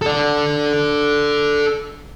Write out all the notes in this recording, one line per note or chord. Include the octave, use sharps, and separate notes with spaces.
A4 D5